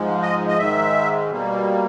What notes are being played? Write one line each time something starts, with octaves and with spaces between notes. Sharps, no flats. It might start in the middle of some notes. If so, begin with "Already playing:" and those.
Already playing: G#2 F3 G#3
D#5
D#5
G#2 D#3 G#3 E5
B2 G3 A#3